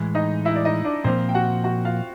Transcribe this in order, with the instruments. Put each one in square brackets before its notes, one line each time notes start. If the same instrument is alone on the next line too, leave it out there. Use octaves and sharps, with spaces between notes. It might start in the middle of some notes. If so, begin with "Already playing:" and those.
Already playing: [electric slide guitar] A2 E3 G#3
[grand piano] D#4 D#5
E4 E5
D5
D#4 D#5
D4 D5
[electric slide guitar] A#2 F3 A#3 [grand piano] C4 C5
[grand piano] G5
F#4 F#5
F#4 F#5
F4 F5